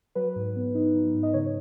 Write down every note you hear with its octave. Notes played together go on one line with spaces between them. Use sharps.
F#3 B4
G#2
B3
D#4
F#3
G#2
D#5
C#3 C#5